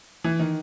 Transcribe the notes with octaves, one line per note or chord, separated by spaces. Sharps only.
E3
D#3